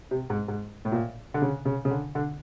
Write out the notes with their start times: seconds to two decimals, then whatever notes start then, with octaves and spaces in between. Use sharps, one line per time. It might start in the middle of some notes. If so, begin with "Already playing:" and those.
0.11 C3
0.30 G#2
0.48 G#2
0.85 A2
0.92 A#2
1.34 D3
1.42 C#3
1.65 C#3
1.85 C#3
1.91 D3
2.15 D3